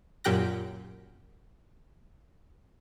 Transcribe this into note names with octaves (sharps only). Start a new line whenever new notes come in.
F#2 A#2 G4 G5 F#6 A#6